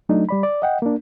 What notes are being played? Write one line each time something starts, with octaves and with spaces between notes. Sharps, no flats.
F#3 A3 D4 D#4
G3 D5 B5
D5
D#5 F#5 G5
A#3 D4